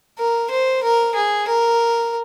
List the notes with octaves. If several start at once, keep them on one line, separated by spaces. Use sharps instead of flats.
A#4
C5
A#4
G#4
A#4